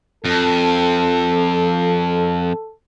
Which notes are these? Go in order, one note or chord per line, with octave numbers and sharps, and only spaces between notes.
F2 A4